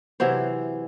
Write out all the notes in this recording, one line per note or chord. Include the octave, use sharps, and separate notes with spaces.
C3 E3 F#3 C5